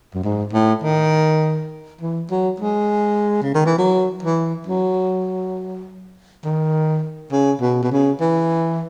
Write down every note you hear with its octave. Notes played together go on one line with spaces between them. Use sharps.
F#2
G#2
A2
D#3
E3
F#3
G#3
C#3
D#3
E3
F#3
E3
F#3
D#3
C#3
B2
B2
C#3
E3